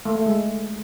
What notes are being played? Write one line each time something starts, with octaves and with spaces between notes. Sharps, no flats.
A3
A3
G#3